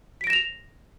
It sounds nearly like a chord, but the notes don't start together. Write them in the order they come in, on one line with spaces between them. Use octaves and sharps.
B6 D7 A#6 E7 F7